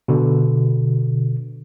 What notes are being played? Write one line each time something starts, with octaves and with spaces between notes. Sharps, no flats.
B2 D3